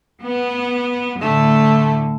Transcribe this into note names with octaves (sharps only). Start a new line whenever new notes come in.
B3
A2 D3 A3